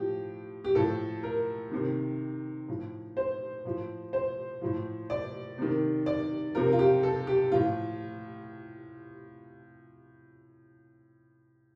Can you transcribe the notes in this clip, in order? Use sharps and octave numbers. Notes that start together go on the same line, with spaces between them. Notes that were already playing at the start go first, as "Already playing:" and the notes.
Already playing: A2 F3 G4
G4
A2 F3 A4
A#4
C3 D#3
A2 F3
C5
A2 F3
C5
A2 F3
D5
C3 D#3
D5
C3 F3 A#4
F4
G4
A4
G4
A2 F3 F4